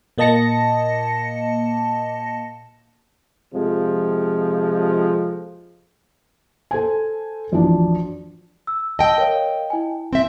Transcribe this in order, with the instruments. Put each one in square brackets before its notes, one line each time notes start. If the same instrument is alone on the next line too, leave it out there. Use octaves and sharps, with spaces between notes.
[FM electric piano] A#2 A#3 D#5 A5 A#6 C#7
[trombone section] F2 C3 F3 G#3
[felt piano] A4 C5 G#5
A1 F2 F#3 D4
[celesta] E6
[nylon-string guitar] D#5 G5 [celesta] A5 E6
[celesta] A#4 C#5 F5
E4 G#5
[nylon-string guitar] C4 E5